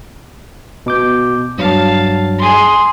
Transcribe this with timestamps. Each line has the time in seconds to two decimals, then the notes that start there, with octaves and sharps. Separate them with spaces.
0.86 B2 D6 G6
1.58 G2 F#3 F5 A5
2.39 G#4 C6